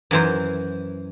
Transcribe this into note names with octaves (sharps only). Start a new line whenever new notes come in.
F#2 E3 C5